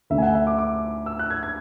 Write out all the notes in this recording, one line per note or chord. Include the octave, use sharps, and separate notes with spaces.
D2 D3 A3 D4 E5
G#5
F#5
E5
D6
D6
E6
F#6
G#6
G#6